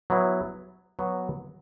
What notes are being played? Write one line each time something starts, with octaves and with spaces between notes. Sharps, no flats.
F#3 B3 E4
F#3 B3 F#4